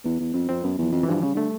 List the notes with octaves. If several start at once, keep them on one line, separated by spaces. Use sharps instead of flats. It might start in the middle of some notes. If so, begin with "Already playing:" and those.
E2 B3
E2
F2 C4
F2 C4
F#2 B3
E2 F3
F2 E3
E3
G2 F3 F#3
C#3 G3
D3 A3